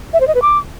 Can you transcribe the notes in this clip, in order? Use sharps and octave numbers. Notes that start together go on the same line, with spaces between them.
E5
C5
D#5
B4
D6